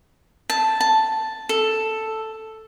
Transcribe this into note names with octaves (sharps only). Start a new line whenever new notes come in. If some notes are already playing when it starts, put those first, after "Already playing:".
A5
A5
A4